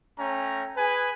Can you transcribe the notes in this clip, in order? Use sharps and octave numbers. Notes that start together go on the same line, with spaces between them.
A3 C#4 G5 A#5
G#4 B4 G#5